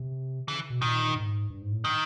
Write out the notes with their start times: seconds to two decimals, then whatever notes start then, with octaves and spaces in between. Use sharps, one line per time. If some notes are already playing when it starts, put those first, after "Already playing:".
Already playing: C3
0.48 C#3 E3
0.70 B2
0.81 A#2 D#3
1.16 G#2
1.50 G2
1.62 G#2
1.72 A2
1.85 D#3